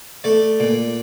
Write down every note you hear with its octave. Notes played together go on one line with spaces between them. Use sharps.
A3 D5
A#2